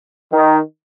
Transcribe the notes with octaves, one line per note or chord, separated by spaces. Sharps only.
D#3